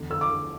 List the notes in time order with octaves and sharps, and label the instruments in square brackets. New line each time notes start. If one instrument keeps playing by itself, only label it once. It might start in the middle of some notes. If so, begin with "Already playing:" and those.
Already playing: [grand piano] E2 D3
D3 E6
D6
D3